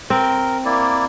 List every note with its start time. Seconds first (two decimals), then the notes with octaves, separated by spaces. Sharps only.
0.10 C4 A#4
0.65 A#3 E4 D5